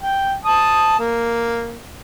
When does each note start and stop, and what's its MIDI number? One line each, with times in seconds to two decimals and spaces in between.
0.02 0.32 79
0.45 0.95 81
0.45 0.95 87
0.99 1.80 58